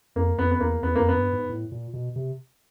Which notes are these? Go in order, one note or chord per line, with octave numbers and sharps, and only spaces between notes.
F2 A#3
F2 B3
B3
E2 A#3
E2 B3
F2 A#3
B3
G2
G#2
A2
A#2
B2
C3